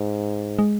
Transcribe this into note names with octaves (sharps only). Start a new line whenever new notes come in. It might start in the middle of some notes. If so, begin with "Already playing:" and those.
Already playing: G#2
G#3